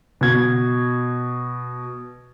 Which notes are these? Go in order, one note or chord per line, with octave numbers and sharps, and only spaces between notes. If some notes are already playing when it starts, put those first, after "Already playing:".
B2 G#6